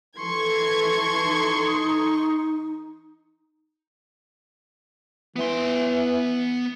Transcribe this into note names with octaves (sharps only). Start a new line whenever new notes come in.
E3 A4 C6 C#6 G#6
D#4
E3 B3 C6